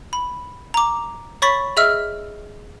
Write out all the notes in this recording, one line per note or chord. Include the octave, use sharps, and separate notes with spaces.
B5
A#5 D6
C#5 B5 C#6 A6 B6
G#4 D#5 E5 E6 F6